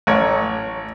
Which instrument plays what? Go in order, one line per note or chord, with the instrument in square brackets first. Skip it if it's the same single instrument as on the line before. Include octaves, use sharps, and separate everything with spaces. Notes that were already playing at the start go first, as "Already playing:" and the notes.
[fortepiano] A1 C#5